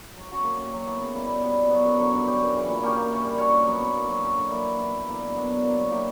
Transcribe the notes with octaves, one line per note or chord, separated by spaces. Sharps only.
F#3
C#4 F#4 C#5
A#3
C#4 G4
F#3
B3 E4
C#3
G3 A#3 E4
B2
G3 B3
B2
F#3 B3
F#2
D3 F#3
G2
F#3 C#4 G4
F#2
C#3 E3
A#2
A#3 C#4 G4
A#3
C#4 E4
G3
C#4 F#4 C#5
G2
F#3 B3
B2
F#3 A#3
F#3
C#4 F#4
D3
A#3 E4 B4
E3
B3 E4
G2
D3 A#3 E4
B2
F#3 B3 D4
F#3
A#3 D4
F#3
A#3 E4 G4